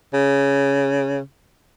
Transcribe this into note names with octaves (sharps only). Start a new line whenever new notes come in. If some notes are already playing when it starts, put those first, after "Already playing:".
C#3